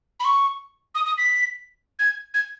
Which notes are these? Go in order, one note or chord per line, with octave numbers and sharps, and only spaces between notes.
B5
C#6
D#6
D#6
B6
G#6
G#6